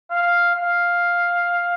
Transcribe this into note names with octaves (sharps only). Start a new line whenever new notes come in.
F5
F5